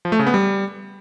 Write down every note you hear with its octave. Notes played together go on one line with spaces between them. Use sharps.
F3
A3
C#3
B3
G3